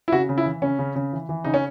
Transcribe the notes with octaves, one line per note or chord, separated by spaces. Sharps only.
E4
C#3 F#4
C#3
E4
E3
C#3 C#4
C#3
C#3
E3
E3
C#3 D#4
C#4